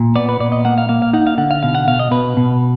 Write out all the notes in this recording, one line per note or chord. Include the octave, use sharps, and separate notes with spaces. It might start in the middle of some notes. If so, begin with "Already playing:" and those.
Already playing: A#2
B3 D5
B4
A#2 D5
D#5
A#3 F#5
F5
A#3 F5
F5
D#4 F#5
F5
D3 F#5
F5
B2 F5
F#5
B2 F5
D#5
B2 B4
B2